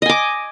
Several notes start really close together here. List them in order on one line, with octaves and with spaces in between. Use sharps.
D#5 G#5 D6